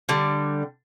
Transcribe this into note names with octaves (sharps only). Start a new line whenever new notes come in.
D3 G3